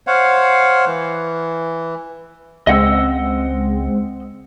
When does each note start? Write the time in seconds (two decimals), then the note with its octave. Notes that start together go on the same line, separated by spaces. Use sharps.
0.07 C5 C#5 F5 F#5
0.86 E3
2.67 C#2 G#3 C4 D#5 F#5 E6